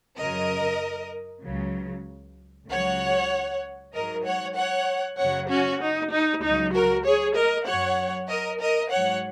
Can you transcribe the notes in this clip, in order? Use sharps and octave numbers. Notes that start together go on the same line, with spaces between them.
F#2 C#3 F#3 A#4 D#5
C#2 C#3 F#3
C#2 C#3 F#3 C#5 F#5
G#2 F#3 A#4 D#5
C#5 F#5
C#5 F#5
F#2 C#3 F#3 C#5 F#5
C#4 F#4
D#4
D#4
C#2 C#3 F#3 D#4
F#4 A#4
G#4 C#5
A#4 D#5
F#2 F#3 C#5 F#5
A#4 D#5
A#4 D#5
G#2 F#3 C#5 F#5